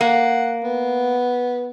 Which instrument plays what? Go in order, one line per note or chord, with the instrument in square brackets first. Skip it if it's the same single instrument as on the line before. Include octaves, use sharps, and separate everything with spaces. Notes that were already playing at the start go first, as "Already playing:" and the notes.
[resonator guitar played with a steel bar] A#3 [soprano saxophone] F#5
[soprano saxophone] B3